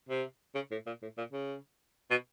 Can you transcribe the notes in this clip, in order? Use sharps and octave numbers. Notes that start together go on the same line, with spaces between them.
C3
C#3
A2
A#2
A2
A#2
C#3
B2